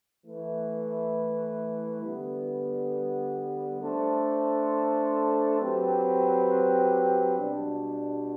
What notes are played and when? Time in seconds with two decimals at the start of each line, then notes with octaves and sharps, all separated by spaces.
0.25 E3 A3 E4 B4
2.03 D3 G3 B3
3.80 A3 D4 A4 C5
5.59 F#3 C4 G4 B4
7.36 B2 G3 D4